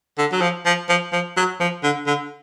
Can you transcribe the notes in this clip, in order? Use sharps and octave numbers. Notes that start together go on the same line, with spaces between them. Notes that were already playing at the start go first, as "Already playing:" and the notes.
D3
F#3
F3
F3
F3
F3
F#3
F3
D3
D3